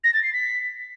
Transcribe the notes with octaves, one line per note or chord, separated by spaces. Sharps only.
A#6
A6
C7
B6